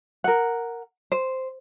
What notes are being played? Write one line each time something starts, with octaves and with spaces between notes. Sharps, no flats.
A#4 F#5
C5